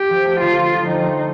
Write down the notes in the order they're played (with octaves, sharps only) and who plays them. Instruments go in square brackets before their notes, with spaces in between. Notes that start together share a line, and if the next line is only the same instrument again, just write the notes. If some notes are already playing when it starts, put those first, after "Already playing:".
Already playing: [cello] G4
[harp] F3
A3
[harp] D3 [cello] F4
[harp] F3
[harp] G3 [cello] D#4
[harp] A3